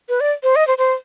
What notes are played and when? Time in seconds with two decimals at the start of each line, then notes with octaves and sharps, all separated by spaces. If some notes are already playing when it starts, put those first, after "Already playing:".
0.09 B4
0.20 D5
0.43 C5
0.56 D#5
0.67 C5
0.78 C5